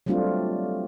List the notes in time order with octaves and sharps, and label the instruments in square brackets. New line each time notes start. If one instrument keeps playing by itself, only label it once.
[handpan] F#3 G3 A3 C4 D4 F4